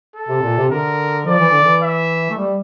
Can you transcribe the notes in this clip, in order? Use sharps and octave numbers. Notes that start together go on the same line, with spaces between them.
A4
C3
A#2
C3
D3 A#4
F3 D5
E3
D3
E3
E5
A3
G3